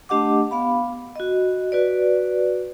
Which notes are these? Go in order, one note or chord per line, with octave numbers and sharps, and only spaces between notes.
A3 D4 G4 D#5 F#5 D6
B3 F5 B5
F#4 D#5
F#4 B4 D5